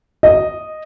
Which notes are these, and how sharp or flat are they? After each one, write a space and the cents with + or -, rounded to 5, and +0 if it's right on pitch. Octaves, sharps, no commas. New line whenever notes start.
D#5 -5